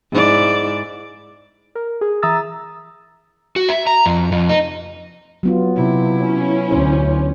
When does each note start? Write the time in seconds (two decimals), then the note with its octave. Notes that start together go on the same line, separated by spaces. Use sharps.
0.12 G#2 E4 D5
1.75 A#4
2.01 G#4
2.22 E3 E5 A#5 D#6 E6 A6
3.56 F#4
3.69 E5
3.87 A#5
4.06 F2
4.32 F2
4.49 D#4
5.43 F#3 B3 F4
5.76 C3 E4
6.21 C#4
6.71 D2 C5